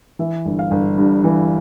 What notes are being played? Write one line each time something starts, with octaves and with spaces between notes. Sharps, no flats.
E3 E5
G1
F5
G1
G2
E3